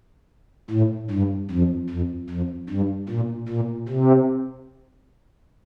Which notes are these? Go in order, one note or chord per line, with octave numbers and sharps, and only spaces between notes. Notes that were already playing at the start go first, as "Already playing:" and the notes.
A2
G2
F2
F2
F2
G2
A#2
A#2
C3